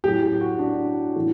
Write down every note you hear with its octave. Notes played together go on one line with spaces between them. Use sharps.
A2 F#3 G4
G4
F#4
D4
A2 E3